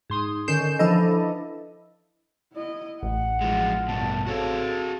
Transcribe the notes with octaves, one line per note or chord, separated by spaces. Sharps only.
G#2 C6 D#6
D3 D#3 C#4 G6 C7 E7
E3 F3 D4 E4 A4 D#5
E4 D#5
A1 F#5
E3 F3 G#3 F4
G2 B2 A5
C4 F#4 G#4 A4 C#5 F5 A5